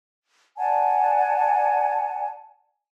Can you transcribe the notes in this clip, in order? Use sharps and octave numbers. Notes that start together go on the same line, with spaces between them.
D5 F#5 G#5 A5